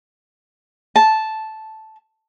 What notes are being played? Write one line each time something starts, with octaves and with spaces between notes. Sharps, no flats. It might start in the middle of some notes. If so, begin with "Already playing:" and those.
A5